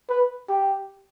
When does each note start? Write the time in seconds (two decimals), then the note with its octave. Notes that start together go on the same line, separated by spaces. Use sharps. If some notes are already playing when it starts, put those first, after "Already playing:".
0.09 B4
0.49 G4